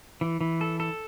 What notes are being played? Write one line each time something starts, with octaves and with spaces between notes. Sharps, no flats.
E3
E3
A4
A4